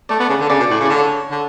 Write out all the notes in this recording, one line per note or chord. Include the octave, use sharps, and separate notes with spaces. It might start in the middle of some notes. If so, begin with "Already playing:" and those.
A3 D5
B3
C#3
D3
C#3 D5
B2
A2
C#3
D5
D3 C#5
D3